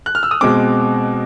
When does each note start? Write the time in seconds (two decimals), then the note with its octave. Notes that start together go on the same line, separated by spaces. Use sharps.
0.06 F#6
0.15 F6
0.23 E6
0.31 D#6
0.41 B2 G#3 C4 D6